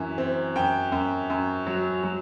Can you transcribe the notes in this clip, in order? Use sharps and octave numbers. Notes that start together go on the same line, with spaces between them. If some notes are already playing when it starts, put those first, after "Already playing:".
Already playing: F#2 E3
C4
F#2 G5
F#2
F#2
F#3
F#3